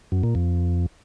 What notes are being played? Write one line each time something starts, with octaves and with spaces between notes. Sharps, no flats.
F#2
A#2
F2